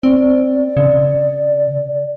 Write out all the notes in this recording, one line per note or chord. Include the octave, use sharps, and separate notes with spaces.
C4 D5
C#3